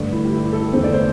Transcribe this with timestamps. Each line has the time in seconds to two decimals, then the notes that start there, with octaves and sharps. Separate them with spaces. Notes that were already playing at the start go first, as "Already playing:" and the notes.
Already playing: G2 D3 A3 D4
0.13 E4
0.25 G4
0.33 E4
0.53 A4
0.73 E2 D3 A3 C5
0.84 D5
0.94 C5